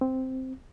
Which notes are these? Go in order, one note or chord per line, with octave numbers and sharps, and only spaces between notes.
C4